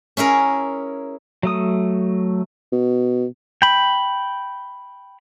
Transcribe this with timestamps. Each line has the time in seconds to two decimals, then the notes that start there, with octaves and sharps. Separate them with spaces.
0.17 C#4 E4 G#4 A#4
1.43 F#3 A3 D#6
2.72 B2
3.62 G5 B5